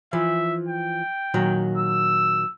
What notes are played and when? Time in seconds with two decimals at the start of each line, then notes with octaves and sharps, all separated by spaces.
0.13 E3 F3 E5
0.68 G5
1.34 A#2 D#3 F#3
1.78 E6